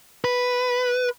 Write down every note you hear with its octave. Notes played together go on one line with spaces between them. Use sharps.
B4